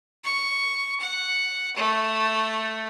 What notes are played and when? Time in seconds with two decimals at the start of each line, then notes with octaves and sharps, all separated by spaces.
0.24 C#6
1.00 F#5
1.76 A3